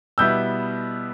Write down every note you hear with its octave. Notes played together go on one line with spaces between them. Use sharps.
B2 G3 B3 E4 E6 G6